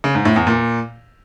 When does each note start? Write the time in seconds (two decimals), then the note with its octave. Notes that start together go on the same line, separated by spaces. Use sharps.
0.04 C#3
0.15 G#2
0.25 A2
0.36 E2
0.47 A#2